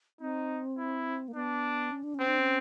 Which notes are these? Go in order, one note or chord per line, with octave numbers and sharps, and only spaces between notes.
C4 D#4
E4
A#3
B3 D4
C#4
D4
C#4
C4
D4
C#4